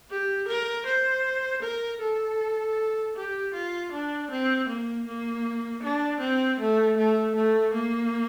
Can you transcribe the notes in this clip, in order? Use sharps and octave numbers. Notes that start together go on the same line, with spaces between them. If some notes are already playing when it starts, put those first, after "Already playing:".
G4
A#4
C5
A#4
A4
G4
F4
D4
C4
A#3
A#3
D4
C4
A3
A3
A3
A#3